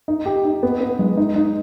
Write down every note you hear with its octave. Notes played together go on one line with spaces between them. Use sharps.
D#4
G4
D#4
B3
B3
G#3
D#4
D#4